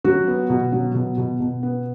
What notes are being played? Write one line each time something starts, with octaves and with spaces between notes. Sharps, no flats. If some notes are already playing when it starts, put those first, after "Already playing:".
F#3 F#4
B3
B2
F#3
B2
B2
B2
B3